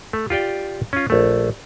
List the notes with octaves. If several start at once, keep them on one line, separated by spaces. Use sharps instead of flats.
A3
F4 G4 D5 G5
C#4 F4
A#1 A3